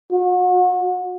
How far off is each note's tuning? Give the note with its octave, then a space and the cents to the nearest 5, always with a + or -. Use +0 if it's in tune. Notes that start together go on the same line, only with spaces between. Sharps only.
F#4 -35